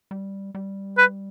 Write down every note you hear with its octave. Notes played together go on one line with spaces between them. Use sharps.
G3
G3
B4